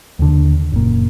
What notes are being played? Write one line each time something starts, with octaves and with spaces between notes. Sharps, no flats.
D#2 D3
F#1 A#2